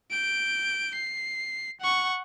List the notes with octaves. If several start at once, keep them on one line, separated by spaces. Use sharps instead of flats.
G6 D7
C7
F#5 C#6